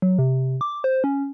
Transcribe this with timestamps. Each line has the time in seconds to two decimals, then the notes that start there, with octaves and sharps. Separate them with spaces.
0.02 F#3
0.19 C3
0.61 D6
0.84 C5
1.04 C#4